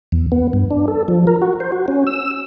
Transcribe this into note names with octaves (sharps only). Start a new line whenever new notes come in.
E2
B3
G2
D4
A4
F3
A#4
F#4
C5
F#4
C#4
E6